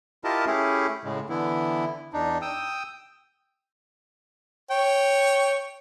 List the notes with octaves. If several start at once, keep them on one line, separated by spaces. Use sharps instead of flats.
E4 F4 G4 A#4 D#5 A5
A3 C#4 E4 G4 G#4
A2 C#3 G#3
D3 E3 B3 E4
E2 D4 D#4
G5 D#6 E6
C#5 G5